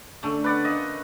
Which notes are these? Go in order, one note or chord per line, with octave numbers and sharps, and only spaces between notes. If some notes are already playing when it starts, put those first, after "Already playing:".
D3 A3 C#4 D4
B3 B4 D5 F#5
A#3 C#4 C5 D#5